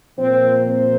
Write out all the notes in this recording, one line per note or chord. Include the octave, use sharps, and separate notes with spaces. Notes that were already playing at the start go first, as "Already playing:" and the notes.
A#2 F3 A#3 C4 C5
C4 C5